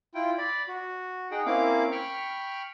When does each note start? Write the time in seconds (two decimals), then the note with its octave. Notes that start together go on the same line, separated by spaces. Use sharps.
0.15 E4 F4 G5
0.38 D5 B5
0.68 F#4
1.31 D#4 G#4 F#5 G5
1.46 A#3 C4 C#4 E4 F5 D6
1.91 G5 B5 C#6 F6